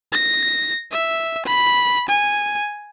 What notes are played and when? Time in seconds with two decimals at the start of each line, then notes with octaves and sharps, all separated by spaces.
0.12 A#6
0.91 E5
1.46 B5
2.09 G#5